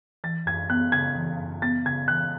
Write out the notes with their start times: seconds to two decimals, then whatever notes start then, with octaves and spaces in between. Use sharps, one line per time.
0.24 E3 A6
0.46 F#2 G#6
0.69 B3 F#6
0.92 C#3 G#6
1.16 E3
1.39 F#2
1.62 B3 A6
1.85 C#3 G#6
2.08 E3 F#6